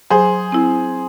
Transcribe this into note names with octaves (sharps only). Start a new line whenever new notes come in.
F#3 G#4 C5
C4 E4